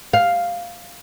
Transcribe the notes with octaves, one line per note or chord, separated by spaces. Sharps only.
F5